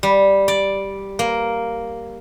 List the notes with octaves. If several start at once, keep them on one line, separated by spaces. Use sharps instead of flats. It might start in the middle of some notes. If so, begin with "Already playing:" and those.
G3
D5
A#3